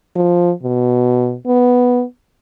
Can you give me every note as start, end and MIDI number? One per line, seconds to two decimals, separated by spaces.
0.16 0.51 53
0.63 1.35 47
1.47 2.03 59